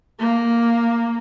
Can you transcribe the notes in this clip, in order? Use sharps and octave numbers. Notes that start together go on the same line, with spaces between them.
A#3